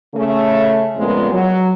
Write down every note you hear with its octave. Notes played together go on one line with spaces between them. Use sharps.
C#3 A3
F2 A#2 C#3 G#3 B3
F#3